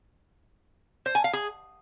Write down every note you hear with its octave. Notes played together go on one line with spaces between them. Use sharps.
C5
G#5
F5
G#4